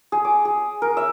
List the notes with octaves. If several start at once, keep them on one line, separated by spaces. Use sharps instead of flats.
G#4
D6
G#4
A#4
E5